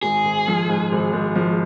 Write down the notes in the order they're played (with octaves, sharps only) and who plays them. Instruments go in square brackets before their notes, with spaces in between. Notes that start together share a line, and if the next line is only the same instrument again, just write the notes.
[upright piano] G#1 [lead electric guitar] G#4
[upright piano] G#1
F3
G#2
G#1
G#1
F3